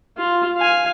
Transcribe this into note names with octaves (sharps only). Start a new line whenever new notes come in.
F4
F5 G#5